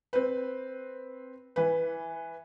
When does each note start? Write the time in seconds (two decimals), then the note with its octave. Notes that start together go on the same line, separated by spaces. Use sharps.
0.13 C4 B4
1.56 E3 B4